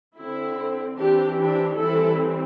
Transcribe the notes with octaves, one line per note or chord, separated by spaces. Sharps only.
D3 C4 E4
E3 C4 D4 G4
D4 G4
E3 G3 C4 E4 A4